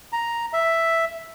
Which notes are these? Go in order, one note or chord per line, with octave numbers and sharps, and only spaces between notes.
A#5
E5